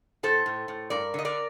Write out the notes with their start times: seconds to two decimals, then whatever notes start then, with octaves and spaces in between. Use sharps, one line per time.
0.23 A2 A4 C5
0.46 A2
0.68 A2
0.90 G2 A#4 D5
1.14 D3 D#5
1.25 A#4 D5